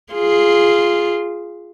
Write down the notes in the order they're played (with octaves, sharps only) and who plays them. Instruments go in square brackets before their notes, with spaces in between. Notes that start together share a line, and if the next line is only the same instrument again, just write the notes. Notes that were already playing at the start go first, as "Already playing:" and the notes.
[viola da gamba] F4 G#4